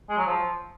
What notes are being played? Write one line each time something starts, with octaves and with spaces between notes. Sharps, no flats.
G#3
F#3
F3